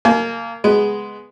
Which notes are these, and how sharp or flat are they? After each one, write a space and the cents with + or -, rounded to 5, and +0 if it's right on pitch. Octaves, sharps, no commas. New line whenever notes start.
A#3 -15 G#5 +40
G#3 +0 B3 +0